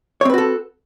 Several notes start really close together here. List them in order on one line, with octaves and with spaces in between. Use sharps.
C#5 C4 B4 F#4 A4